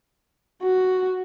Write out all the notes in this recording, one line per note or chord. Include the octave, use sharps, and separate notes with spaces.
F#4